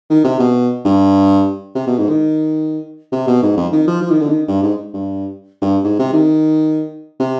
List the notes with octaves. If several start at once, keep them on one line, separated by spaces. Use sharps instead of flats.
D#3
C3
B2
G2
C3
B2
G#2
D#3
C3
B2
G#2
F2
D#3
F3
F3
D#3
D3
D#3
G2
G#2
G2
G2
G#2
C3
D#3
C3